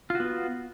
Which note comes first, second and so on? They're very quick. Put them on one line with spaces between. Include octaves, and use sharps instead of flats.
F4 F#4 B3